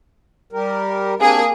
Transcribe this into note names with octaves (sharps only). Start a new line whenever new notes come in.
G3 G4 A#4
A#3 C4 D4 G4 G#4